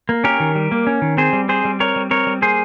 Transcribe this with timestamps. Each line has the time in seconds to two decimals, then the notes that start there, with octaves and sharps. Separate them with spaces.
0.09 A#3
0.24 C#4 G4 A#4
0.40 D#3
0.55 G3
0.72 A#3
0.87 C#4
1.02 D#3
1.17 C4 G#4 C5
1.33 G3
1.49 C4 G#4 C5
1.65 G3
1.80 C4 A#4 C#5
1.96 G3
2.11 C4 A#4 C#5
2.27 G3
2.42 A#3 G#4 C5